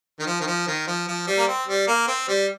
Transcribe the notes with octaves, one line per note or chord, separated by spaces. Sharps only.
D#3
F3
D#3
F3
D#3
F3
F3
G3
A#3
C4
G3
A#3
C4
G3